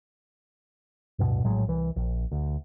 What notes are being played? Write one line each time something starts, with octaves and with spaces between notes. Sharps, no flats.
D1 G2 B2
A#1 A2 F#3 G#3
C2 E3
A#1
D2